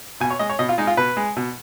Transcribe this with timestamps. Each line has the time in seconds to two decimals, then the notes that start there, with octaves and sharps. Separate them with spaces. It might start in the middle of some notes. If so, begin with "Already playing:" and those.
0.20 B2 G#5
0.30 C#5
0.39 G#3 D#5
0.50 C#5
0.59 B2 D#5
0.69 F4
0.78 G#3 D#4
0.87 F4
0.97 B2 B4
1.17 G#3
1.37 B2